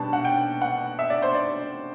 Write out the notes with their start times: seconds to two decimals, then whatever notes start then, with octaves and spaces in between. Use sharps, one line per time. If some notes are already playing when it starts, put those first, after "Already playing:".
Already playing: B2 G3 D4 A5
0.13 F#5
0.25 G5
0.62 F#5
0.99 E5
1.10 D5
1.22 C5
1.35 D5